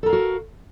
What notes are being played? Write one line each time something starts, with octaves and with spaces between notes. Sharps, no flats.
F#4 A4 A#4 F5